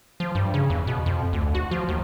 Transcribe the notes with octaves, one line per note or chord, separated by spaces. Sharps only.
F3
G2
C#3
E2
B2
F2
D2
F#4
F3
D#2